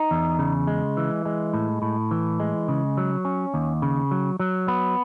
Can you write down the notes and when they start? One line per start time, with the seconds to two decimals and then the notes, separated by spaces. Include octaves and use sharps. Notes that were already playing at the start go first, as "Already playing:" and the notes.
Already playing: D#4
0.11 E2
0.39 C#3
0.67 G#3
0.97 E3
1.25 G#3
1.53 A2
1.82 A2
2.11 E3
2.40 G#3
2.68 C#3
2.97 F#3
3.25 C#4
3.54 D#2
3.82 C#3
4.11 F#3
4.40 F#3
4.68 B3